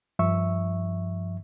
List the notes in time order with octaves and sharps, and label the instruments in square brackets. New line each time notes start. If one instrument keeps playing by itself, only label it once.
[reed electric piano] G2 F3 E5 C#6 E6